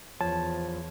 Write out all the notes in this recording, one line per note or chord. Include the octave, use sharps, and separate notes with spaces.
E2 F3 C#5 A5